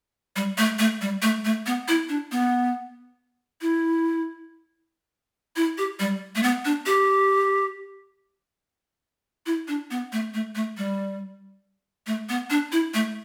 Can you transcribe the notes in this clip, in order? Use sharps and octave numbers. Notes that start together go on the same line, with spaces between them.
G3
A3
A3
G3
A3
A3
B3
E4
D4
B3
E4
E4
G4
G3
A3
B3
D4
G4
E4
D4
B3
A3
A3
A3
G3
A3
B3
D4
E4
A3